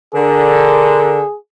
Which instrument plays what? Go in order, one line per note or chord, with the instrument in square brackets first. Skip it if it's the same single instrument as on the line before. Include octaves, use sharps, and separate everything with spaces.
[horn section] D3 [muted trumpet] G#4 [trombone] A#4